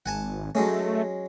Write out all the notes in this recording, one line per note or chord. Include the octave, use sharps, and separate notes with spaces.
G#1 F#5 G#5 A5
F#3 G#3 A3 C#4